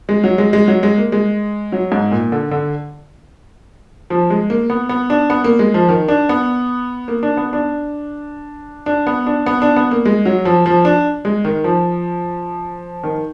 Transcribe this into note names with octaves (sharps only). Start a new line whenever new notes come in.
G#3
F#3
G#3
G#3
F#3
G#3
A#3
G#3
F#3
G#2
A#2
D3
D3
F3
G#3
A#3
B3
B3
D4
B3
A#3
G#3
F3
D#3
D4
B3
A#3
D4
B3
D4
D4
B3
D4
B3
D4
B3
A#3
G#3
F#3
F3
F3
D4
G#3
D#3
F3
D#3